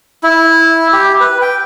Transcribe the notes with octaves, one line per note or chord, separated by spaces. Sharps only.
E4
G4
B4
G5